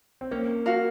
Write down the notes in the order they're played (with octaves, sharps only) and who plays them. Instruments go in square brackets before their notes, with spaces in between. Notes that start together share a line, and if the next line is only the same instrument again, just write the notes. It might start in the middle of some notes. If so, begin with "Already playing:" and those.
[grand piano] C4
[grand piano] A#3 [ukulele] C#4
[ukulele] F#4 A#4 F5